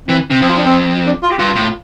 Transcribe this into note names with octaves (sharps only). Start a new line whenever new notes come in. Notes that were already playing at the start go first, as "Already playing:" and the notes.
E3 C4
C3
F2 C4
F4
D4
C4
D4
F4
G4
G2 F4
A2